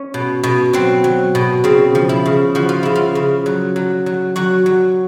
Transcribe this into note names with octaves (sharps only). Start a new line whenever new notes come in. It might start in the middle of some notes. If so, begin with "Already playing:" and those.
Already playing: C#4
B2
B2
F#3 C4
F#3
B2
C#3 C4
F3
E4
C#3
F3 F#4
F4
C#3 E4
F4
C#3
F#3
F#3
F#3
F#3 F#4
F#3